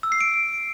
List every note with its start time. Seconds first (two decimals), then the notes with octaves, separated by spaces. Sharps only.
0.03 E6
0.12 C7
0.21 D7